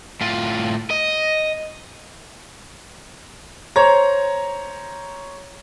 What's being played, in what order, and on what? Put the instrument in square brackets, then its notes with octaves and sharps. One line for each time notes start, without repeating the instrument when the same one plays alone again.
[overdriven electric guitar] A2 F4
D#5
[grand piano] C5 C#5 A#5